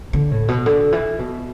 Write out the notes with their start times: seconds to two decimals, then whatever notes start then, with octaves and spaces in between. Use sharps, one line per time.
0.13 D3
0.31 A2
0.48 B2
0.66 D3
0.92 E3
1.19 B2